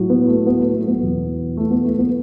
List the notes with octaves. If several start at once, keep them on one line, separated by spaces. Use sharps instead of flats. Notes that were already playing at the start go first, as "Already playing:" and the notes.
Already playing: A2 F#3
B3
A3
B3
A3
A3
B3
E2 B2 F#3
A3
B3
A3
B3